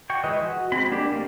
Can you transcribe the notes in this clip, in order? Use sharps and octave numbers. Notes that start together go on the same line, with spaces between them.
F#4 G5 C#6
E3 G#3 B4 D#5
F#4
G#3 C4 B5
A#3 D4 G4
A3 A#3